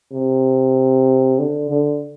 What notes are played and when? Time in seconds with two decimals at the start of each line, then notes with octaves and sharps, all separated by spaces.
0.12 C3
1.39 D3
1.70 D3